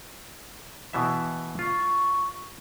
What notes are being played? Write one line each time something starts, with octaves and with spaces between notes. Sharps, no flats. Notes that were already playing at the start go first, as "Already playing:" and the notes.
B2 E3 E5
F4 C#6